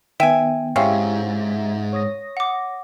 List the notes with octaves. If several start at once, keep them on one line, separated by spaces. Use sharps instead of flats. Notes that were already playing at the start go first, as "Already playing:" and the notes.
D#3 B3 E5 G5 G#5 D#7
G#2 C4 C#4 E4 G4 E5 F5
C#5 D#6 A#6
F#5 D6